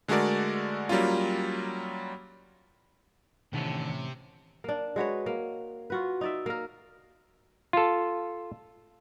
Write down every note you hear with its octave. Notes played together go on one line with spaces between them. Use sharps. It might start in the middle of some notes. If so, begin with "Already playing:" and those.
D3 G#3 A3 F#4 A#4 D5
F#3 G3 A#3 C#4 F4
A2 C3 D#3 E3 C#4 D4 A5
A#3 D4
G#3 F#4 B4 C#5
A#3
F4 F#4 B4
D#4 D5 E5
A#3 A#4
F4 A4